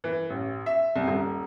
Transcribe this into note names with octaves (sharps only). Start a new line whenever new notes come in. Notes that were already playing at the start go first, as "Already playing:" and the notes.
E3
A1
E5
C2
D#1